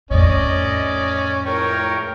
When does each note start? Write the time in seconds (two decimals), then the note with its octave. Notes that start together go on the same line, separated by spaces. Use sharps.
0.11 F2 A2 C#4 D5 D#5
1.46 C#2 A3 A#4 C#5 G5 C#6